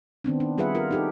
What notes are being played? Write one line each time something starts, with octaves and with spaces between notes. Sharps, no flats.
D#3 B3 C4 D4
D4
G3 F4 G#4 B4 E5 F#5
F4 A#4
D#4 G4 A4